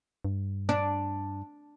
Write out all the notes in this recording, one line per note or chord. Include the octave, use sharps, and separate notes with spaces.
G2
D4